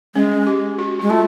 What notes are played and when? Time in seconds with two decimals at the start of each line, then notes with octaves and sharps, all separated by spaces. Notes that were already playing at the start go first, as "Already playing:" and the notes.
0.15 G#3 C#4
0.47 G4
0.78 F#4
0.99 G#3 F#4
1.10 A3 F4